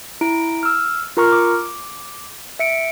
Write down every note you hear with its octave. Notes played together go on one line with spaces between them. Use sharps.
E4 A#5 D7
E6 F6
F4 A#4 A#5 C#6 F6
D6
E5 C#7 D7